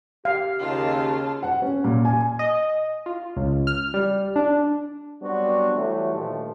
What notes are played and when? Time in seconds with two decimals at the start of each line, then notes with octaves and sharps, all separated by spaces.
0.25 G4 F5
0.60 D#2 C#3 F4 A5
1.43 F#5
1.62 C#4
1.84 A#2
2.05 G#5
2.39 D#5
3.06 F4
3.36 C#2
3.67 F6
3.94 G3
4.36 D4
5.22 F#3 G3 B3 C4 D4 F#4
5.75 E3 F#3 G3 A3
6.14 G2 A#2 D#3 F3 A3